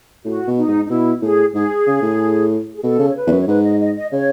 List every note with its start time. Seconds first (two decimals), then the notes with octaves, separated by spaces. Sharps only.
0.25 A2 F#4
0.47 B2
0.57 D#4
0.68 G#2
0.85 D#4
0.90 B2 E4
1.22 A2 G#4
1.54 G#2 G#4
1.87 C#3
2.02 A2
2.75 G#4
2.83 B2 A4
2.99 C#3
3.08 C#5
3.15 B4
3.27 E2
3.31 F#2
3.41 C#5
3.47 G#2 B4
3.64 D#5
3.80 D#5
3.95 D#5
4.11 C#3 C#5